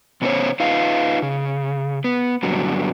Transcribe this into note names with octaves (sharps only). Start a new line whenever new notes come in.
C3 B3 C#4 D#4 C5 C#5
D#4 F4 B4 D#5 F5
C#3
B3
G2 B2 D3 F#3